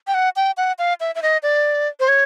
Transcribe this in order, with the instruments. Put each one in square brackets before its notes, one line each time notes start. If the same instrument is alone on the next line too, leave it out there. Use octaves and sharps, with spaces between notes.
[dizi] G5
F#5
G5
F#5
F5
E5
E5
D#5
D5
C5
C#5